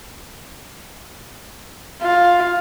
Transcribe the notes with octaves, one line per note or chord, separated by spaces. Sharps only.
F4